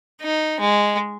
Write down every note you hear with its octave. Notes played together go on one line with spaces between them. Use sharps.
D#4
G#3